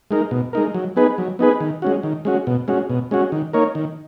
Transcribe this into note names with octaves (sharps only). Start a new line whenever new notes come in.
G#3 D#4 A#4
B2
G#3 D#4 A#4
F#3
B3 D#4 G#4 B4
F#3
B3 D#4 G#4 B4
D#3
G#3 C#4 F#4
D#3
G#3 C#4 F#4
B2
G#3 C#4 F#4
B2
G#3 C#4 F#4
D#3
A#3 D#4 A#4 C#5
D#3